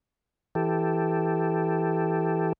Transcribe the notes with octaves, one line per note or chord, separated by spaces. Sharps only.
E3 G4 A4